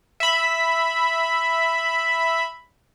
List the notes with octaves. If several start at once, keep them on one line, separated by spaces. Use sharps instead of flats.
E5 B5